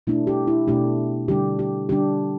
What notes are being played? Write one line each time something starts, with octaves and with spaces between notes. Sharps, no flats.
B2 A3 D4 E4
G4
E4
B2 A3 D4 G4
D3 G3 D4 G4
G4
D3 G3 D4 G4